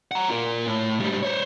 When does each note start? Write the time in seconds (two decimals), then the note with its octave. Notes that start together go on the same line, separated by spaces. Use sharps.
0.11 F#5 A#5
0.30 F4 A#4
0.66 A2
1.00 G#2 G3
1.23 C5 C#5